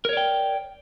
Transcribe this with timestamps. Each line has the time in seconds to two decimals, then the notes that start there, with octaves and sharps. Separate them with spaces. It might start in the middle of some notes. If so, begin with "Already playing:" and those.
0.05 A#4
0.09 C#5
0.13 D5
0.17 G5